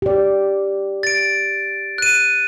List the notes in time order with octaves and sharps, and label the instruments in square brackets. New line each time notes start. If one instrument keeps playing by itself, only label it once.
[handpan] G4 D5
[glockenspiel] A6 D7
F#6 D#7